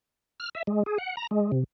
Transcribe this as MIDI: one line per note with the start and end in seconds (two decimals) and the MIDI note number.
0.40 0.49 89
0.55 0.63 76
0.67 0.83 56
0.86 0.98 68
0.98 1.16 78
1.17 1.27 82
1.31 1.51 56
1.52 1.64 48